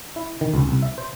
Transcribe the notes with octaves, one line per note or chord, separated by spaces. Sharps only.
E4
D#3
C#2
C2
E5
C5